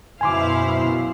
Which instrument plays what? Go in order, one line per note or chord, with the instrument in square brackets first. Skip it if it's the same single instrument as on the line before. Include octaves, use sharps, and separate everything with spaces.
[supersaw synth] F#2 B2 [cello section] E4 C5 F5 [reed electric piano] G#5 C6 D6